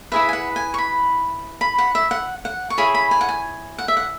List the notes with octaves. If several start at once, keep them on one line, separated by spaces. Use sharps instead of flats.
E4 G#4 B4 E5
G#5
F#5
G#5
C#6
B5
B5
F#5
E5
F#5
F#5
C#6
E4 G#4 C#5 B5
B5
G#5
F#5
G#5
F#5
E5
F#5